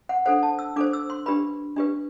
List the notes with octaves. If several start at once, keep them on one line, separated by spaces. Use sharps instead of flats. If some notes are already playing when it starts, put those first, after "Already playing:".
F#5
D4 A4 C5 F#5
A5
E6
D4 A4 C5 D6
E6
C6
D4 G4 B4 B5
D4 G4 B4